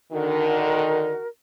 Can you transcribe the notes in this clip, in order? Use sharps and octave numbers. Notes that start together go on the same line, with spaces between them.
D3 D#3 F#4 A#4